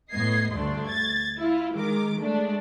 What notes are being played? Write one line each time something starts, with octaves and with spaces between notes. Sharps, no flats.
A2 B3 D#5 G#6 C7
D2 G2 A3 D4 C6
G#6 A6
E4 F4
D#3 G#3 A#4 D6
G#3 A3 D4